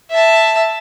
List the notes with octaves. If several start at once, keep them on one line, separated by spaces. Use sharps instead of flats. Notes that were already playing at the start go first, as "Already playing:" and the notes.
E5 A5